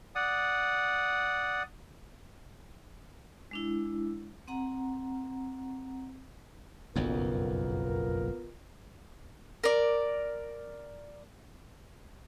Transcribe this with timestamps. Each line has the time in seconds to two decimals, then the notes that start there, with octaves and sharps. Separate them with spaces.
0.15 D5 F#5 D#6
3.51 G#3 D4 E4
4.48 C4 F#5 A#5
6.96 F#1 B1 F2 B3 F4 A#4
9.64 A#4 D5